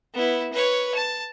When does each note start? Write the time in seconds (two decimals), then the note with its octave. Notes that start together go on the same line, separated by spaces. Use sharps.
0.14 B3 E4
0.53 B4 C#5
0.95 A5